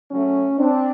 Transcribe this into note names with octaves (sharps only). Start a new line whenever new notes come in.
C#3 F#3 A3 C#4
C4 D4